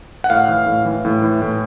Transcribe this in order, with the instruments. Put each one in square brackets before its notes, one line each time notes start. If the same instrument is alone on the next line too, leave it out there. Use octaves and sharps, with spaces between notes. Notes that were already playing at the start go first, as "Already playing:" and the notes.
[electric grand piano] F#5
A2 F5
E3
A2
E3
A2
E3
A2